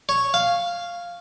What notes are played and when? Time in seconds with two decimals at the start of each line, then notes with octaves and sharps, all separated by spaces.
0.09 C#5
0.34 F5